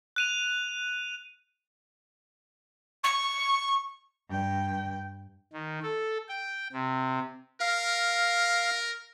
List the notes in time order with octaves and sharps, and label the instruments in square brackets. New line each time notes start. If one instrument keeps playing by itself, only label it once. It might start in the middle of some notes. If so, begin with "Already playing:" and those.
[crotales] F#6 D#7 F7
[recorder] C#6
[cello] G2 G5
[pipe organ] D#3
A4
G5
C3
[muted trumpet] A#4 [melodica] F5